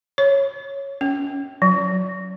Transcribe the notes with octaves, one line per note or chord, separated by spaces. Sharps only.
C#5
C#4
F#3